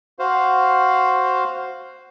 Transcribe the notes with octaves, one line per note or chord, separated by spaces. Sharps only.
F#4 C5 F5